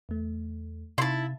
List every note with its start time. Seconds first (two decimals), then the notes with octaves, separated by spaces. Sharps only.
0.09 E2 A3
0.98 C3 D#4 E4 F5 A5 C6